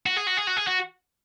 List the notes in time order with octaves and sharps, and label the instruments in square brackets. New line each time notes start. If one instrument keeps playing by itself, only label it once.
[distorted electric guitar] F#4
G#4
F#4
G#4
F#4
G#4
F#4